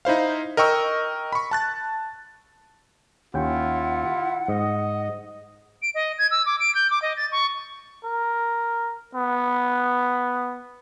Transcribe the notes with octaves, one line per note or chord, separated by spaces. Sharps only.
D#4 E4 C5 F5
A#4 D#5 G5 C#6 E6
B5 C#6
A5 F#6 A6
D#2 C#4 E4 F4 F#5 G5
G#2 D#5
D7
D#5
G#6
E6
D6
D7
G6
D6
D#5
A6
C#6
A#4
B3